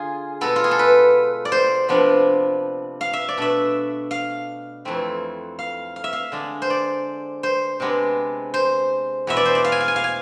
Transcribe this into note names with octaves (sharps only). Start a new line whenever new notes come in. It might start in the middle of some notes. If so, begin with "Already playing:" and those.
Already playing: D3 F4 G#4
B2 G#3 B3 A4
F4
G#4
A4
B4
D5
C5
C3 F3 B3 D4
F5
E5
D5
B2 A3 D4 E5
F5
F2 E3 A3 C4
F5
F5
E5
F5
D3 G#3 D4
C5
D5
C5
C3 G#3 B3 D4
C5
E2 B2 G#3 B3 E5
D5
C5
D5
F5
G#5
F5
G#5
F5
G#5